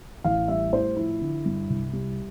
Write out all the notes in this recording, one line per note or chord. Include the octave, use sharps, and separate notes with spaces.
A1 F5
G3 E5
A2 C5
F3 E4
D3
G2
C2
G3